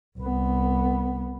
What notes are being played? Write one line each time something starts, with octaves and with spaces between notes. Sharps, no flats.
C2 B3